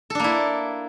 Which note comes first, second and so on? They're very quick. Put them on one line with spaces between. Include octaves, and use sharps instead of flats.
A4 D4 A#3 E4